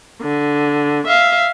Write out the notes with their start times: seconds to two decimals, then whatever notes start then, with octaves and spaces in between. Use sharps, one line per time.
0.22 D3
1.07 E5 F5